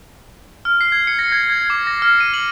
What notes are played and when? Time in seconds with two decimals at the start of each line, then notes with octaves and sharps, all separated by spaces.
0.65 F6
0.81 C7
0.92 G#6
1.07 C#7
1.19 A#6
1.32 G#6
1.50 G#6
1.70 D6
1.87 A#6
2.02 F6
2.20 D#7
2.34 F#7